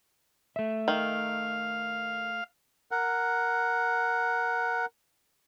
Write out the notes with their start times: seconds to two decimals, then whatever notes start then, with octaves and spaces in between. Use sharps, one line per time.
0.56 A3 E5
0.88 D#3 F5
2.91 A#4 F#5